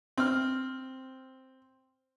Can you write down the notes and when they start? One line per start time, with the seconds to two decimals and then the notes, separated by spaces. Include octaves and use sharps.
0.18 C4 F6